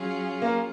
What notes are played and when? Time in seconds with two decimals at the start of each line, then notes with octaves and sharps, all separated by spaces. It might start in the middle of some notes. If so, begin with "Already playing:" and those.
Already playing: F#3 C#4 F4 G#4
0.42 A#3